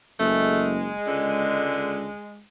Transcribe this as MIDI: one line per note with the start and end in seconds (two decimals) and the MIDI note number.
0.19 0.94 30
0.19 2.41 56
0.19 0.75 57
1.07 2.09 37
1.07 2.11 50